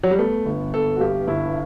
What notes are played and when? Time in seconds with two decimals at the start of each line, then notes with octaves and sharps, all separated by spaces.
0.04 F#3
0.11 G3
0.19 A3 B3
0.46 G1
0.74 B3 A4
0.96 F#4
1.00 G2 G4
1.27 G1 E4